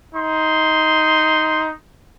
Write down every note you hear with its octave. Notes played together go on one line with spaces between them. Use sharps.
D#4 C6